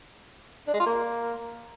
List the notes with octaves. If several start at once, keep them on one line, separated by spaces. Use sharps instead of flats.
D4
G#3
F4
A#3